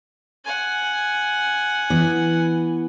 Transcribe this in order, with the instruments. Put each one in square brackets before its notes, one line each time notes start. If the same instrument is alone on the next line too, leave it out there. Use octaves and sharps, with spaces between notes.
[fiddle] F#5 G#5
[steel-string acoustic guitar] E3 B3